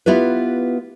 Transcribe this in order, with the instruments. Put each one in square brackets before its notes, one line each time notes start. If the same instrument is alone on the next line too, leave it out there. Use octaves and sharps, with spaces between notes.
[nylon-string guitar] B3 E4 F4 G4 B4